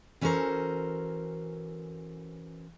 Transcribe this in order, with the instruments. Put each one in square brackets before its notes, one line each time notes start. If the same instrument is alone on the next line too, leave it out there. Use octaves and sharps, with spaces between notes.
[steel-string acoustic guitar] E3 C#4 F#4 A4 A#4 C5